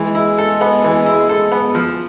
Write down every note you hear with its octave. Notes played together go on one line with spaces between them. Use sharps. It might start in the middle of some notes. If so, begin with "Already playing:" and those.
Already playing: E3 G#3
E4
A4
B3
E3
E4
A4
B3
F3